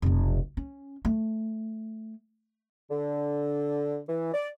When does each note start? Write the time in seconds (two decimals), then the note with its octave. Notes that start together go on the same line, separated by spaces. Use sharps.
0.02 F1 B1
0.57 C#4
1.05 A3
2.90 D3
4.07 E3
4.33 D5